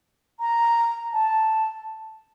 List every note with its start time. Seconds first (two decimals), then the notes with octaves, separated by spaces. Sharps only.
0.40 A#5
1.13 A5